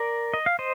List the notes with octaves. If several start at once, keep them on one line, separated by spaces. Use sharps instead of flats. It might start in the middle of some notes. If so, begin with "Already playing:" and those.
Already playing: A#4 D5
D#5
F5
C5 D#5